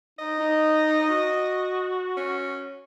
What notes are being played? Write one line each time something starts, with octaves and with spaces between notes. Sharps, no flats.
D#4 D#5
D#4
F#4
C#4